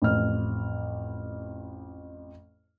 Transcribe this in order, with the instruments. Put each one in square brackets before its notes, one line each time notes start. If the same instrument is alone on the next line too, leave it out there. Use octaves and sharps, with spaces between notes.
[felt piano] A1 F2 F6